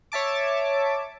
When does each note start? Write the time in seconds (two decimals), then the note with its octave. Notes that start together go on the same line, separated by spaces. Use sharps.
0.12 C#5 E5 A5 D6